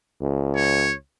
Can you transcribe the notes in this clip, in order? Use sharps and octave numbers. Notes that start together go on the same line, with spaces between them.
C#2
C#5